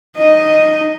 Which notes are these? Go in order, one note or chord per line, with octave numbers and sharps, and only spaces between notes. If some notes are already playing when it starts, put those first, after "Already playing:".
D#4 D#5